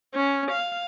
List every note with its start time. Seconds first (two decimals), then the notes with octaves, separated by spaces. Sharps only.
0.14 C#4
0.51 F5